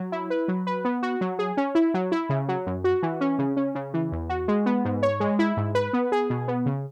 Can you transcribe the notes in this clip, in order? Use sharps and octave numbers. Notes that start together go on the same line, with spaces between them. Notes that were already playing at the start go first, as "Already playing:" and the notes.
Already playing: F#3
E4
B4
F#3
B4
B3
F#4
F#3
G#4
C#4
E4
F#3
E4
C#3
F#3
F#2
F#4
E3
C#4
C#3
C#4
C#3
E3
E2
F#4
G#3
B3
G#2
C#5
G#3
E4
G#2
B4
B3
G#4
B2
B3
C#3